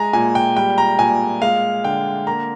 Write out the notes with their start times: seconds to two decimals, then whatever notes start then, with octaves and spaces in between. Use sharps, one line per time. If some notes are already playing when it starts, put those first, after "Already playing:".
Already playing: G#3 G#5 A#5
0.13 A#2 G#5
0.35 G5
0.56 G3 G5
0.78 A#5
0.99 A#2 G#5
1.42 G#3 F5
1.84 D3 G5
2.27 A#3 A#5